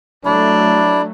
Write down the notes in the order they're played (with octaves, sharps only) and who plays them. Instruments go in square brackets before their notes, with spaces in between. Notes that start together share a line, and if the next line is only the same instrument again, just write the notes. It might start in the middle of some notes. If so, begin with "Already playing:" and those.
[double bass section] F#3 A3 [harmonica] D4 [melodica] E4